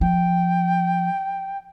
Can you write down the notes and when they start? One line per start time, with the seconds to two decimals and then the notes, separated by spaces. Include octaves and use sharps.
0.01 F3 G5